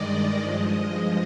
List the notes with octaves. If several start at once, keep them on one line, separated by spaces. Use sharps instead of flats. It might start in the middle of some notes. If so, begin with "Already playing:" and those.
Already playing: G2 D#3 G#3 D5 D#5
G2 F3 G#3 D#5